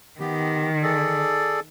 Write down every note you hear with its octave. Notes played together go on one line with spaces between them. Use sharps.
D#3 B3 G4
G#4 A4 D5